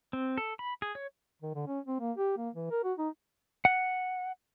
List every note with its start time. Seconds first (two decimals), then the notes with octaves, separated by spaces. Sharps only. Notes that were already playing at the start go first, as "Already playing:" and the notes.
0.13 C4
0.38 A4
0.59 B5
0.82 G#4
0.95 C#5
1.42 D#3
1.55 D3
1.67 C#4
1.86 C4
2.01 A#3
2.17 G4
2.38 A#3
2.55 E3
2.71 A#4
2.84 F#4
2.98 D#4
3.65 F#5